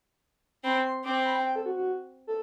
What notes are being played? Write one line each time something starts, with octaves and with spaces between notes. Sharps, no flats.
C4 B5
C6
C4 D6
C6
B5
G5
G5
A4
F#4
F#4
A4